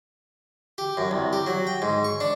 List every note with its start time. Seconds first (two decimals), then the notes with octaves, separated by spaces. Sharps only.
0.78 G4
0.97 F#2
1.11 C2
1.33 G4
1.46 F#3
1.67 G5
1.82 G#2
2.04 C#6
2.20 D4